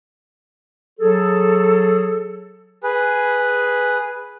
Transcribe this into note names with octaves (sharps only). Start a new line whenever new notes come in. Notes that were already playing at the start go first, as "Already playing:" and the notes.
F#3 G#4 A4
G#4 B4